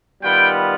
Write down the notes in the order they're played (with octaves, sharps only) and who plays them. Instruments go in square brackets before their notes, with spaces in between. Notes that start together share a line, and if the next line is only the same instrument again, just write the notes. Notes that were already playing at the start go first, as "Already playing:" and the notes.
[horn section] D#3 G3 B3 F4 G5